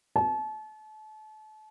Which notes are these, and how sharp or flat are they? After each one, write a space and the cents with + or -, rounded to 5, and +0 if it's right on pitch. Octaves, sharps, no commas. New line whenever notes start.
A5 -35